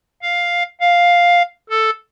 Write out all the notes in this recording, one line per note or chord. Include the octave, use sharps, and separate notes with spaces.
F5
F5
A4